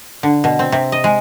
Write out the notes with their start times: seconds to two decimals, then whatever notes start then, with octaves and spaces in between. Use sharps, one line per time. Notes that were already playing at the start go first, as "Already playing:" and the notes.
0.23 D3
0.44 B2
0.59 C4
0.72 C3
0.92 D#5
1.04 G#3